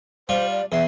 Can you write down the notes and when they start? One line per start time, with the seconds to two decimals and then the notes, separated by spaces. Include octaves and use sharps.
0.29 G3 F4 C5
0.50 D5
0.72 E2 E5 C6